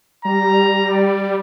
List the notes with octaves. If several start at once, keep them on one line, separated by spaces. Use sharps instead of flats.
G3 A#5
D5